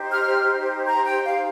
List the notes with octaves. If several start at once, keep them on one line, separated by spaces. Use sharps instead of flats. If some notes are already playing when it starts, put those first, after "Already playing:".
Already playing: D#4 G4 C5
F6
A#5
G5
F5